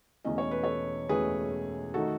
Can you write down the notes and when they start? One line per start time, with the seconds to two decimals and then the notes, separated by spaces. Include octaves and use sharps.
0.25 E1 E2 B2 A3 C#4 D#5
0.38 C#5
0.51 B4
0.64 A4 C#5
1.09 E1 E2 B2 A3 C#4 G#4 B4
1.94 D#3 A3 D#4 F#4 A4